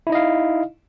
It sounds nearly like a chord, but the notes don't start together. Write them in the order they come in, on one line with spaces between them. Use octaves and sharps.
E4 D#4 D#5 F5